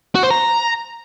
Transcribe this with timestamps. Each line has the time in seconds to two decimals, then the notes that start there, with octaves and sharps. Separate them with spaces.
0.15 F#4
0.23 C5
0.31 A#5